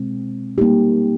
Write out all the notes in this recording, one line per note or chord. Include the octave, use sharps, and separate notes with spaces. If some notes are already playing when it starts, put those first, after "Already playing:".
Already playing: B2 G#3 C4
G3 A#3 D#4 G4